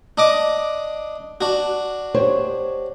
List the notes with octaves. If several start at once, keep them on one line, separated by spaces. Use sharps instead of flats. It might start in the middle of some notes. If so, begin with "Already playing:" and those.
D4 D#5 D6
D4 F#4
G4 C5 C#5